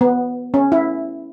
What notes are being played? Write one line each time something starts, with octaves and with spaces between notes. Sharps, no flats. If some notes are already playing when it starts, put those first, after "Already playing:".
B3
C#4
E4